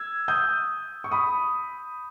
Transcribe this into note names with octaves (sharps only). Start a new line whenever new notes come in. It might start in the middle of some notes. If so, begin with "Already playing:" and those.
Already playing: E6 G#6
D#6 G6
C#6
B5 D#6